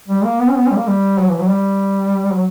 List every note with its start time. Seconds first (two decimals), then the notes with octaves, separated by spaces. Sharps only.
0.08 G3
0.24 A#3
0.40 B3
0.48 C#4
0.56 B3
0.66 C#4
0.71 G3
0.77 A#3
0.87 G3
1.19 F#3
1.29 E3
1.40 F#3
1.50 G3
2.33 F#3